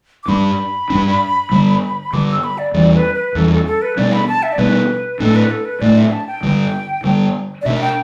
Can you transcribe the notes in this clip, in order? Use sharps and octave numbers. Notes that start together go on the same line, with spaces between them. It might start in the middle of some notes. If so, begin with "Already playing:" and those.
D6
G2 G3 D4 B5
G2 G3 D4
G2 D3 G3
G2 D3 G3 D6
E6
B5
D5
E2 E3 G3 D5
B4
B4
E2 E3 G3 A4
A4
A4
B4
B2 G3 B3 D4 D5
B5
A5
E5
D5
B2 G3 B3 D4 B4
A2 A3 D4 A4
B4
A4
B4
A2 A3 D4 D5
E5
A5
G5
G2 D3 G3
G2 D3 G3
D5
B2 B3 D4 E5
E5
G5